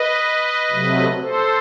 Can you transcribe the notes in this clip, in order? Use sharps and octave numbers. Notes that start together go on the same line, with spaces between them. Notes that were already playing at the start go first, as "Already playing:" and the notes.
Already playing: B4 D#5
C3 F#3 A3
A4 C5